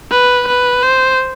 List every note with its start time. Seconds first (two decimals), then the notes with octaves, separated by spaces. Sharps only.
0.11 B4
0.48 B4
0.82 C5